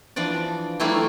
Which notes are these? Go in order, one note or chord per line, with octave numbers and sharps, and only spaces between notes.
E3 F3 D4 D5
E3 F#3 G3 A3 E4 F4